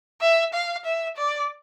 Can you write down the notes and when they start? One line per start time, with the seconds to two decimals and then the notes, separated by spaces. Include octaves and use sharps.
0.21 E5
0.54 F5
0.85 E5
1.17 D5